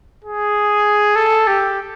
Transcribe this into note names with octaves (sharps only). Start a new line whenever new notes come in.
G#4
A4
G4